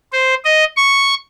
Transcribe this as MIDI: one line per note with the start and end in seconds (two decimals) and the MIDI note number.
0.13 0.35 72
0.45 0.64 75
0.77 1.15 85